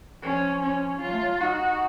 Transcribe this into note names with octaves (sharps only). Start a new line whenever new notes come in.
F3 C#4
C#4
F#3 F4
A3
F#3
D#4 F#4